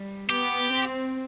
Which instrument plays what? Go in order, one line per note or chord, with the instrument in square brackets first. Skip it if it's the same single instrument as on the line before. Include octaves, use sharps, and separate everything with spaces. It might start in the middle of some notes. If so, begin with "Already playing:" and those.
Already playing: [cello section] G3
[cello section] B3 [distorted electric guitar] G4
[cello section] C4